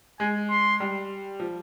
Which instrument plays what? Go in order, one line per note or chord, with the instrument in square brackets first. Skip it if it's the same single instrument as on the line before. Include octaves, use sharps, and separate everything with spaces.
[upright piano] G#3 [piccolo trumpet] G#5
[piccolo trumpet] C6
[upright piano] G3
F3